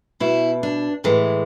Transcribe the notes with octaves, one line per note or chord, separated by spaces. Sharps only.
B2 E4
D4
A2 E3 G#3